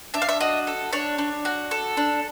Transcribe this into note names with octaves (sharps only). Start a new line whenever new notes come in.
D4 E5
F5
E5
F#4 D#5
A4
D4 C#5
D4
F#4
A4
D4